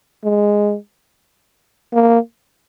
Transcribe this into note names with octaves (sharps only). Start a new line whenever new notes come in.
G#3
A#3